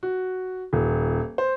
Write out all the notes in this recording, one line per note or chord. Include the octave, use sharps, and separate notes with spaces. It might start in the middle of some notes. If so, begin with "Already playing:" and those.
F#4
D#1
C5